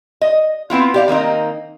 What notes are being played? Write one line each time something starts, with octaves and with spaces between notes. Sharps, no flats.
D#5
B3 C4 E4 F4
G4 D5 F5
D#3 A#3 C4 D#4